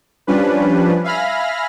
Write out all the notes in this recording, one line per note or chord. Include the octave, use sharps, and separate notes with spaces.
F3 G3 C#4 D4 B4
E5 F5 G#5 B5 F6 A#6